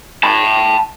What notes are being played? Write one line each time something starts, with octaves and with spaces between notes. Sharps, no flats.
A5 B5